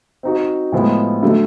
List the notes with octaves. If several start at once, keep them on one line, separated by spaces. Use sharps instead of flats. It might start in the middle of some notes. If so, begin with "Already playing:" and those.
C4 D#4 F#4
A2 F3 G#3 B3
D3 F#3 A3